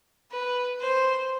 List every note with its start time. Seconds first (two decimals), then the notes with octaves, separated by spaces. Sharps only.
0.31 B4
0.81 C5